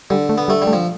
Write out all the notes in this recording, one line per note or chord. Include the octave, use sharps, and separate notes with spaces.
D3 G3
A3
B3
G3 A3
G3
A3
F3